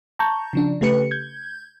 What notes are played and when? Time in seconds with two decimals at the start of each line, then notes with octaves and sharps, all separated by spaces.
0.19 A5 A#5 C#6 G6
0.53 C#3 F3 D4
0.81 C#3 A3 G4 B4 C#7
1.11 G6 G#6